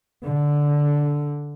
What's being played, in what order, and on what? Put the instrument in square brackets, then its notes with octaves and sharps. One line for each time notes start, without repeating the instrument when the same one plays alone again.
[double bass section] D3